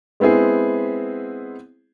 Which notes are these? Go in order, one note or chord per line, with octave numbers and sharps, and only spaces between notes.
G#3 B3 C4 E4 G#4